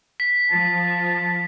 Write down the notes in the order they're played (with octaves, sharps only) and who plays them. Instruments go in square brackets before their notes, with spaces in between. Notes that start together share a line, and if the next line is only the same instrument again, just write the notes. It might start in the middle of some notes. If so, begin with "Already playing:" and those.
[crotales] B6
[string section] F3 [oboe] A5